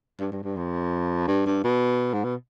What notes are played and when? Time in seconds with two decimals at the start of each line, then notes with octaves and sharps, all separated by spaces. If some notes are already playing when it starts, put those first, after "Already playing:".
0.19 G2
0.32 G2
0.43 G2
0.56 F2
1.27 G2
1.46 G2
1.64 B2
2.14 G#2
2.24 B2